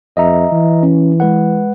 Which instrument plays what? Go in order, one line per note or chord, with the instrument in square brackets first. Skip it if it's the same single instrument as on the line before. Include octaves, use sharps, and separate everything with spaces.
[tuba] F2 [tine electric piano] D#5 E5 A#5
[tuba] E3
[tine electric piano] C#4
G#3 B4 F#5